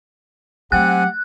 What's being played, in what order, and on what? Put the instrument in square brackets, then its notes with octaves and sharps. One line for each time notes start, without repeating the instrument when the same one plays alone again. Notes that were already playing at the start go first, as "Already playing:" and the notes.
[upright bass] F#3 A3 [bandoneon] C4 G#5 [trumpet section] G4 F#5 [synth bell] F#6